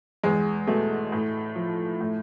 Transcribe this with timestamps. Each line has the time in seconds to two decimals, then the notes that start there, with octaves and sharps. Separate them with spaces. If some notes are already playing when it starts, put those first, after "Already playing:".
0.23 E2 G#3
0.67 B2 A3
1.12 A2
1.56 F3
2.01 A2